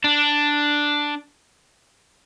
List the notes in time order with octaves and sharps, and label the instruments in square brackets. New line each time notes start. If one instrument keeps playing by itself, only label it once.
[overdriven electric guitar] D4